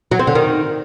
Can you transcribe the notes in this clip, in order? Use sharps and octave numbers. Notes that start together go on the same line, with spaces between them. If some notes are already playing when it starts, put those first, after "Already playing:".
F#3
C4
D3
D#3